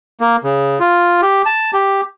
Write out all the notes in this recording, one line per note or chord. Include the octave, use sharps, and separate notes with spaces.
A#3
C#3
F4
G4
A5
G4